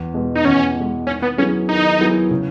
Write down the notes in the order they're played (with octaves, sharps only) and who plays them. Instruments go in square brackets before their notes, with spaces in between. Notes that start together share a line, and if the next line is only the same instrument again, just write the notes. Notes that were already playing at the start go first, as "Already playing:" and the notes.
Already playing: [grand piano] E2
B2 G#3
[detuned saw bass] D#4
[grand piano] E2 [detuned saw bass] C#4
[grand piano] B2
G#3
[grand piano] D#3 [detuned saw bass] C#4
[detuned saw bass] B3
[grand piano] F#3 B3 E4 G#4 [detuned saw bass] C#4
[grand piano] D#3 [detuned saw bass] D#4
[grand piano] F#3 B3 E4 G#4
C#3